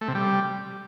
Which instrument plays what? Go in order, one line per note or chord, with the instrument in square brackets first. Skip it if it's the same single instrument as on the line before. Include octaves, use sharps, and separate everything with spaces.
[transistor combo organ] A3
C3
G3